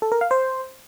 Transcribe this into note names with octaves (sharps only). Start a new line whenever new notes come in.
A4
A#4
F5
C5